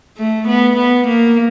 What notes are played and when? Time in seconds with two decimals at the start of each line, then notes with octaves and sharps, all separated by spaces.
0.18 A3
0.48 B3
0.77 B3
1.08 A#3